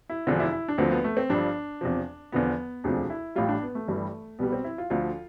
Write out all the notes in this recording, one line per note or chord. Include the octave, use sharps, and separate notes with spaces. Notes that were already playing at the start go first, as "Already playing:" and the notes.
E4
E1 E2 D3 F3 D4
E4
E4
D4
D2 D3 F3 C4
B3
A3
C4
G1 G2 F3 D4
E2 C3 F3
E2 D3 F3 B3
E1 D2 C3 F3 D4
E4
A1 A2 G3 F4
D4
B3
A3
G1 G2 E3 G3
C2 B2 G3 B3
C4
E4
F4
D2 D3 F3 F4